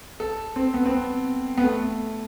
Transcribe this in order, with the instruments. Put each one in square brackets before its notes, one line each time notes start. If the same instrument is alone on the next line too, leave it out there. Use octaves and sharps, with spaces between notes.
[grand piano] A4
C4
B3
C4
B3
B3
A3